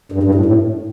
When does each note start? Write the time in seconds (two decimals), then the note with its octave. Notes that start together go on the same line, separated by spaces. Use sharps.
0.12 G2
0.23 G2
0.35 A2
0.45 A2